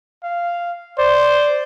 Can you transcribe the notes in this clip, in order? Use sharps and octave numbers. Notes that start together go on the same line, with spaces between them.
F5
C5 D5